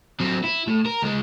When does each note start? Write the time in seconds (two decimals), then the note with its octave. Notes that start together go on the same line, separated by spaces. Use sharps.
0.20 F#3 C4
0.44 E4
0.67 A2
0.85 A#4
1.02 C#2 G#3